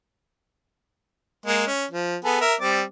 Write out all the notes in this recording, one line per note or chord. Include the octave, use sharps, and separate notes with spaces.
G#3 A#3
C#4
F3
B3 G#4 A4
A#4 E5
G3 C4 D5